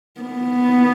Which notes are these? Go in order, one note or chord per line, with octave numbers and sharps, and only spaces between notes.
B3